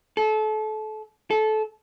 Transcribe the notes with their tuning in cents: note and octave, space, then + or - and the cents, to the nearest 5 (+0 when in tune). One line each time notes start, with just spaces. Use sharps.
A4 -30
A4 -20